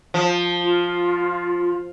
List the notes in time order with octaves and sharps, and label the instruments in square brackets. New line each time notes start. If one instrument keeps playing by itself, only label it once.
[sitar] F3
[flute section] F4